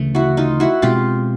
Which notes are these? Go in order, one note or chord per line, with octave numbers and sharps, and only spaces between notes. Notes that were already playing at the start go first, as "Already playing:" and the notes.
Already playing: D2 C#3 E3 A3
E4 F#4
D#4 F4
E4 F#4
B2 G#3 C4 F4 G4